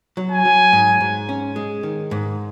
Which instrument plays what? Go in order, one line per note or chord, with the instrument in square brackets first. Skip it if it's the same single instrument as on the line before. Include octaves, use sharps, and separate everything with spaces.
[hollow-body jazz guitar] F#3
[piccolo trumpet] G#5
[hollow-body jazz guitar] F#3
G#2
G#2
C#4
G#3
D#3
G#2